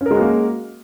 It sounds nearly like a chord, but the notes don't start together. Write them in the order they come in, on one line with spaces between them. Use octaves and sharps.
C#4 A#4 G#3 F#4 A#3